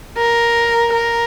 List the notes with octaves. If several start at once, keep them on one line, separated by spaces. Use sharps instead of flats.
A#4
A#4